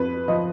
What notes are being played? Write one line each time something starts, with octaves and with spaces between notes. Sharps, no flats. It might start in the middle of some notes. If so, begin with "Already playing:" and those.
Already playing: F2 B4
F3 D#5